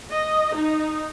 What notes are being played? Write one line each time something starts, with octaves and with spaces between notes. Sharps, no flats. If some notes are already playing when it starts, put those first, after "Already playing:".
D#5
D#4